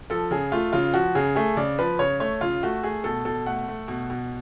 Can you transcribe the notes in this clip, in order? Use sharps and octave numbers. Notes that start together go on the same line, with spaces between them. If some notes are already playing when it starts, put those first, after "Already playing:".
F3 A4
C#3 G#4
A3 F4
C#3 F4
F3 F#4
C#3 G#4
A3 G#4
C#3 D5
F3 B4
C#3 C#5
A3 C#5
C#3 F4
A3 F#4
A3 G#4
B2 A4
B2 A4
A3 F#5
A3
B2
B2